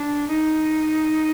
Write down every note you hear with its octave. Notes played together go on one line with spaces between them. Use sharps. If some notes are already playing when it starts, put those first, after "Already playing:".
Already playing: D4
D#4